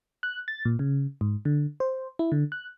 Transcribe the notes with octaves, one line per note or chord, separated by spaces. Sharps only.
F#6
A6
A#2
C#3
G#2
D3
C5
E4
D3
F#6